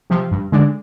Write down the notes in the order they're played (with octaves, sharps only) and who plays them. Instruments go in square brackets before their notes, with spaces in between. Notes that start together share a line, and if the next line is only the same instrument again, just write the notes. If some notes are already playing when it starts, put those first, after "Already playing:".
[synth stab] C3 F3
G2
D3 G#3 D4